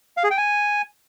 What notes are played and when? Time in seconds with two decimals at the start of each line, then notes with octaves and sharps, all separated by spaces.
0.17 F5
0.24 G#4
0.31 G5
0.37 G#5